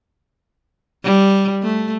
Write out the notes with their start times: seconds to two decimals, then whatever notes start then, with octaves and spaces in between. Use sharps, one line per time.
1.04 G3
1.63 A3